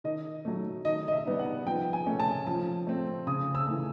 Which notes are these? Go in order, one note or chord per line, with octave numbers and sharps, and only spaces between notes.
D#3 D#5
F#3 A3
D#3 D#5
D#5
E5
G3 B3 D#4
F#5
F3 G5
G#5
A3 C#4
A5
F3 A5
A3 C4
C#3 D#6
E6
E3 A3